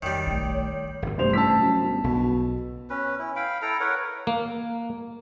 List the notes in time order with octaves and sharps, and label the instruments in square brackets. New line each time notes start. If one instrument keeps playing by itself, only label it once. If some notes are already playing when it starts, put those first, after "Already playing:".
[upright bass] F2 [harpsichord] D#3 G3 [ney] C#5
[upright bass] A#1 A3
[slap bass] G#1 D#2
[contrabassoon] G1 [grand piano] G2 C5 F7 [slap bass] C3 A3
[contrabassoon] A1 [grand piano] A5 E6 B6
[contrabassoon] F#2
G1
[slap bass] B1 [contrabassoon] B2
[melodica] C#4 B4
E4
F5 G5 B5
E4 A4 G5 A#5
A#4 B4 C#5 F#5
[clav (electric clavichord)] A#3